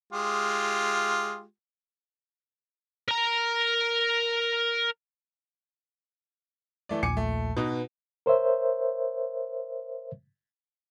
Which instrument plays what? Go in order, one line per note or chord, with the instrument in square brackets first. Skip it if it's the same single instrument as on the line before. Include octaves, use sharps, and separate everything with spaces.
[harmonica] G#3 F4 G4
[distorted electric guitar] A#4 A#5
[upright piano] E3 A3 D5
[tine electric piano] A#1 D#2 A#2 [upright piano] G#5 D6 C#7
[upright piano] A3
[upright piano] B2 D#4 [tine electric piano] B4
[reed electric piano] A#4 C5 C#5 E5